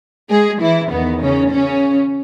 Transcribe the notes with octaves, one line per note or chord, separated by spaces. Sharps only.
G#3 G#4
E3 E4
E2 D#3 B3
C#3 C#4
C#3 C#4